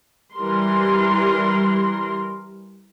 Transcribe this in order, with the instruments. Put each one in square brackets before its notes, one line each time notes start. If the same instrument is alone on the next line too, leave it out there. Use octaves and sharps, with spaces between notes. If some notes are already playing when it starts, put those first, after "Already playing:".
[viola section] E3 G3 A#4 C6